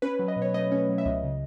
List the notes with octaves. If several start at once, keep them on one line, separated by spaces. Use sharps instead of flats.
C#4 B4
F#3
D#5
B2
C#5
A3 D#5
C#4
F#3
E5
C#2 D#5
C#3